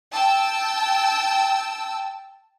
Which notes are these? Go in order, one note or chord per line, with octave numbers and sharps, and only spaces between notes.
G5 A5 E6